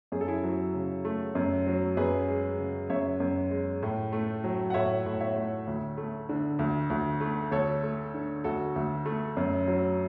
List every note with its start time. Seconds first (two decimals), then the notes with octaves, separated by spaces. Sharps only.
0.12 F#2 G#4
0.21 A4
0.28 E4 G#4
0.43 F#3
0.74 C#3
1.05 A3
1.35 F#2
1.67 F#3
1.97 F#2 G#4 B4
2.28 G#3
2.58 C#3
2.90 F#2 C#5 E5
3.20 F#2
3.51 G#3
3.83 A2
4.12 A3
4.44 F#3
4.70 F#5
4.74 A2 C#5 E5
5.06 A2
5.20 C#5 E5
5.36 A3
5.67 D2
5.97 A3
6.29 D3
6.59 D2
6.90 D2
7.21 A3
7.51 D2 A4 C#5
7.83 A3
8.14 D3
8.44 D2 F#4 A4
8.76 D2
9.05 A3
9.37 F#2
9.68 F#3